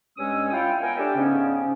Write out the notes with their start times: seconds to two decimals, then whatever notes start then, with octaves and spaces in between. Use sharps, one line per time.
0.17 G2 G#3 C#4 C#5 D#6 E6
0.52 E4 F4 C#5 F5 G5
0.81 B3 A#4 G5 G#5
0.97 D4 G4 A4 C#5 E5 G5
1.15 G#2 C#3 B3 C#4